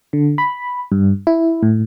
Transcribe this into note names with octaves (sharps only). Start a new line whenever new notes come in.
D3
B5
G2
E4
A2